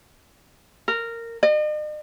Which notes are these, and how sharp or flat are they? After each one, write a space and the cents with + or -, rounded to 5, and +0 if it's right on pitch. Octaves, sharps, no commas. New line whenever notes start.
A#4 -15
D#5 -45